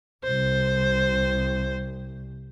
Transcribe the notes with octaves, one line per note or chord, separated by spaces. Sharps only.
C2 C5